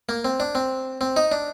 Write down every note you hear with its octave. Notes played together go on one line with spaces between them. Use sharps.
A#3
C4
D4
C4
C4
D#4
D4